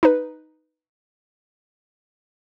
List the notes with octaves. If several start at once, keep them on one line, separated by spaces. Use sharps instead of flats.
D#4 B4